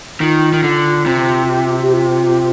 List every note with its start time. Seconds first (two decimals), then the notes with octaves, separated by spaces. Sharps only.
0.20 D#3 F4
0.53 D#3
0.63 D3
1.06 C3
1.82 G4
1.93 F4